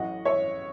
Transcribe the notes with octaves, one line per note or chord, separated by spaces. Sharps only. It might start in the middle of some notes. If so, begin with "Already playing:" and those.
Already playing: A1 A2 F#3 D#5 F#5
C#5 E5